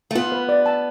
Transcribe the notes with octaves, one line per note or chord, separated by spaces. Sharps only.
A3
B3 F4
B4
D5
A5